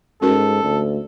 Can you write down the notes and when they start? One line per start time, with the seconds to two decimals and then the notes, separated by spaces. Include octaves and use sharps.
0.22 G#2 C#4 F#4 A4 A#4
0.63 D2